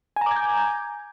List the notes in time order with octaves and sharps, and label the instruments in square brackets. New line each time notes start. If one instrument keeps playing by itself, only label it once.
[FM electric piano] G#5
A#5
D6
G#6
G6